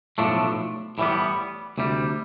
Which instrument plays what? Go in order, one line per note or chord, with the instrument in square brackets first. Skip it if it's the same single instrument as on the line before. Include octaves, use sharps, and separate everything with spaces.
[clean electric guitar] B1 A2 F3 A3 D4
A2 E3 G3 B3
D2 C3 G3